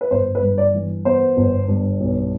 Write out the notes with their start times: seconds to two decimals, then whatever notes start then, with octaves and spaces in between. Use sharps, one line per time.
0.01 B4
0.11 G1 C5
0.35 B4
0.42 G2
0.58 D5
0.74 E3
1.05 B3 C5
1.37 G1
1.68 G2
2.00 B1